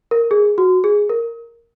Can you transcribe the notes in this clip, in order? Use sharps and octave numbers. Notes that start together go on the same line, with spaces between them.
A#4
G#4
F#4
G#4
A#4